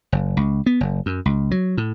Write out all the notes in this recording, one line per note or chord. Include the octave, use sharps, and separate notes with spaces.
F#1
C#2
B3
F#1
F#2
C#2
F#3
A2